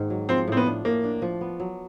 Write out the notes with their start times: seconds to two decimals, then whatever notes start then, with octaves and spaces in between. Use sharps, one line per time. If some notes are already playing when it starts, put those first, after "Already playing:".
Already playing: G#2 D#3 A#3
0.10 F#3
0.29 F3 C4
0.47 A2 C4
0.57 B3
0.66 D4
0.85 A2 A#3
1.04 D4
1.22 F3
1.41 B3
1.60 F#3